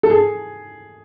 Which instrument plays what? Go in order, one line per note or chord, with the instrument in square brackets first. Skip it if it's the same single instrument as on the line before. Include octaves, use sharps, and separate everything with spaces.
[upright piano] A4
G#4